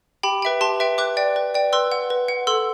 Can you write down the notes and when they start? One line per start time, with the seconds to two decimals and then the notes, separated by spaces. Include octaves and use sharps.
0.23 G4 G5 B5
0.42 B4 E5 G5
0.61 G4 A5 C6
0.80 B4 E5 G5
0.98 B4 D6 F#6
1.17 D5 G5
1.36 B4
1.54 D5 G5
1.73 B4 C6 E6
1.92 F#5
2.10 B4
2.28 F#5
2.47 A4 C6 E6